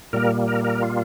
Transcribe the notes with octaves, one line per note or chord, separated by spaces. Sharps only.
A#2 G3 A#3 A#4
A#4
A#4
F4